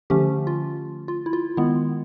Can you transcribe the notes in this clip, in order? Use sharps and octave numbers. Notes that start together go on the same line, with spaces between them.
D3 F3 A3 C#4 G4
F4
F4
E4
F4
D#3 G#3 B3 E4